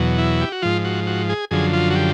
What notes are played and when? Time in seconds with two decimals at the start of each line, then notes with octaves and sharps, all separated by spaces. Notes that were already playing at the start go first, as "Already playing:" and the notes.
Already playing: E2 B2 F#3
0.18 E4
0.41 G4
0.52 F#4
0.62 G#2 F3 F4
0.85 F#4
1.07 F#4
1.29 G#4
1.51 F#2 D3 F3 G#4
1.73 F4
1.90 F#4
1.95 G4